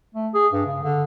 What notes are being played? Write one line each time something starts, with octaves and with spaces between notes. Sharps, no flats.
A3
G#4
G2
C#3
D3